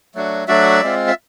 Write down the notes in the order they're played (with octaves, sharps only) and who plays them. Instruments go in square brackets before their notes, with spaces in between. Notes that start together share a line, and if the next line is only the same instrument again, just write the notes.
[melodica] F#3 A3 D4 F#4
F#3 A3 D4 F#4 D5 E5
G#3 C4 F4
E5